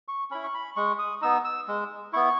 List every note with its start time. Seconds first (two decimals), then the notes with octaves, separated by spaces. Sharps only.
0.08 C#6
0.31 C#4 E4 B5
0.44 C#6
0.54 B5
0.76 G#3 C#6
0.99 D#6
1.21 B3 D#4 E6
1.45 E6
1.68 G#3
2.13 B3 E4 C#6